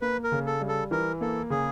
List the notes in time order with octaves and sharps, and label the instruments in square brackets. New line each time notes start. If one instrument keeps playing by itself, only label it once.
[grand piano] A#3 [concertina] B4
[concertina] A#4
[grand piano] C#3
[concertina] A4
[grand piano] G3
[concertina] A4
[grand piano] E3 [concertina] A#4
[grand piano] A#3 [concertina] A4
[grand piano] C#3 [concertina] G#4